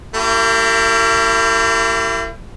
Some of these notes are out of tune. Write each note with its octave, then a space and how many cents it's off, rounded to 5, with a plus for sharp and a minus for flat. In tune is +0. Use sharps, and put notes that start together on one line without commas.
A#3 -45 E4 +25 G4 -25